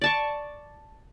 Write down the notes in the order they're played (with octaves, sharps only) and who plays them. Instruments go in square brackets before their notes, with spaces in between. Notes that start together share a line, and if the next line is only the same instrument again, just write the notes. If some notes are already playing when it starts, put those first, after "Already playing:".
[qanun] D5 A5 C#6